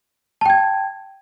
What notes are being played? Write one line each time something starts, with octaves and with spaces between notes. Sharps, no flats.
G5 A5 G#6